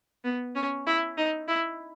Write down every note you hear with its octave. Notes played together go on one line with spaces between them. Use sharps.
B3
C#4
E4
D#4
E4